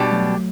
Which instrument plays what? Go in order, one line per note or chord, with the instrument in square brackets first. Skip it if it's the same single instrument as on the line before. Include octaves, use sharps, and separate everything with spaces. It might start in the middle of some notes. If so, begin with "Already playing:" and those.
Already playing: [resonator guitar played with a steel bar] B2 G3 D4 G4
[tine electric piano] F#3 A3